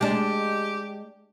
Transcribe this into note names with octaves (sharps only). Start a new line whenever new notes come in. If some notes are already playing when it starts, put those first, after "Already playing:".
G#3 D4 G4